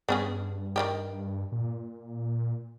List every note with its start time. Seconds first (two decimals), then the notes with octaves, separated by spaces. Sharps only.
0.09 G2 B3 C#4 G#4
0.76 D#3 F#3 G4
1.52 A#2